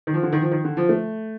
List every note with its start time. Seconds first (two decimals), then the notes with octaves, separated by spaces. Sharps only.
0.07 D#3
0.14 F3
0.23 D3
0.32 D#3
0.42 F3
0.51 D#3
0.64 D3
0.77 F3
0.89 A3